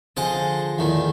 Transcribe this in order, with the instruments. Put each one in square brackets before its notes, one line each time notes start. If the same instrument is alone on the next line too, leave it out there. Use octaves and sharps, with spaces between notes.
[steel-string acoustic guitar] D3 F3 G#4 [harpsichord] C5 D#5 A5
[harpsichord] E2 A2 D#3